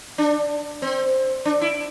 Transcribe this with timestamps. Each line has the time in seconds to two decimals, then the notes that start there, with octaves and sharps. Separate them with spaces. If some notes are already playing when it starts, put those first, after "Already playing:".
0.18 D4
0.82 C4
1.45 D4
1.61 E4